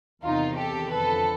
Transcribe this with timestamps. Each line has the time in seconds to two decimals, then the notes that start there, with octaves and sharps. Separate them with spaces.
0.24 E2 C3 D#3 D#4 F4
0.58 G4 A4
0.92 F2 D3 F3 A4 B4